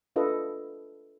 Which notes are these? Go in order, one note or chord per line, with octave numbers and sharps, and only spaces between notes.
D4 F4 A4 B4 D#5